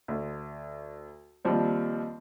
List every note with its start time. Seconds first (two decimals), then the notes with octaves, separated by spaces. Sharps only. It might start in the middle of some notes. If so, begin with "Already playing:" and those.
0.08 D2
1.45 D#2 F3 G3 C4